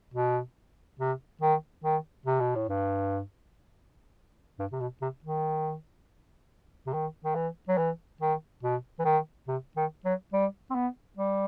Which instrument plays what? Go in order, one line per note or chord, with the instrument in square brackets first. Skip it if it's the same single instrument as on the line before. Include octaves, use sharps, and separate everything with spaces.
[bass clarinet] B2
C3
D#3
D#3
C3
B2
A2
G2
G2
C3
B2
C3
D#3
C3
D#3
D#3
E3
F#3
E3
D#3
B2
E3
D#3
C3
D#3
F#3
G3
C4
B3
G3